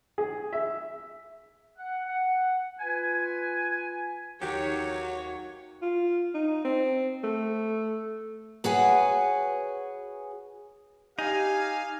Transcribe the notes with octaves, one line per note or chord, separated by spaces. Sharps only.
G#4
E5
F#5
F#5
F4 B4 G#5
D#2 F#3 G4 C#5
F4
D#4
C4
A3
F#4 G#4 B4 C#5 F#5 G#5
D#4 G4 F5 G#5